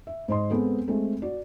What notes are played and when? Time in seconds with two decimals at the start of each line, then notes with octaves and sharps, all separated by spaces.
0.07 E5
0.28 G#2 C5 D#5 C6
0.50 G#3 B3 C4 A4
0.88 G#3 A3 C4 A4
1.22 F#4 D5